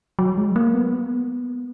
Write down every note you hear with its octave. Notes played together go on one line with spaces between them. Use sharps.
F#3
G#3
A#3
B3